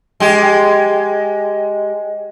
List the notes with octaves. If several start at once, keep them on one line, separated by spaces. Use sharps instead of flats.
G#3 G4